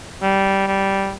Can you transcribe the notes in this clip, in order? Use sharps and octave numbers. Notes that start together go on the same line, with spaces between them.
G3
G3